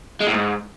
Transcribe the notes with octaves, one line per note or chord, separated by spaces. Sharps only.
G#3
A2
G#2